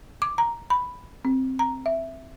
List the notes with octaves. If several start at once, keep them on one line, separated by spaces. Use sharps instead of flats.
D6
A#5
B5
C4
A#5
E5